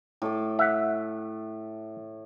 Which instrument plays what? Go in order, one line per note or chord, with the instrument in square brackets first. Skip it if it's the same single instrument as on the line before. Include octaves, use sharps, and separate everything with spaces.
[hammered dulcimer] A2 A4 D6
[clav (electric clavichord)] E5 F#5